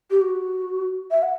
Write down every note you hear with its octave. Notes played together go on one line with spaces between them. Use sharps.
G4
F#4
E5
F#5